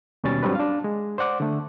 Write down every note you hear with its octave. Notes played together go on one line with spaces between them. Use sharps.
D#2 B2 G3 C#4 A6
G#2 F#3 G3 C4 D4 B4
D4 F5
G#3
C5 D5 F#5 D6
D3 A3